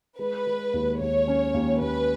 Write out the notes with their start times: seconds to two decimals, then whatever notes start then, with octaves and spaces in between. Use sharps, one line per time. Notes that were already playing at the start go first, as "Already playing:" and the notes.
0.19 G#3 B4
0.47 G#3
0.74 D#2
1.01 D#2 C#5
1.28 C#4
1.54 D#2
1.81 D#2 B4